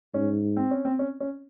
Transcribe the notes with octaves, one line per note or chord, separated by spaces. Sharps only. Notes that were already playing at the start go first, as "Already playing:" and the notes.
G#2 C#4
C4
C#4
C4
C#4
C#4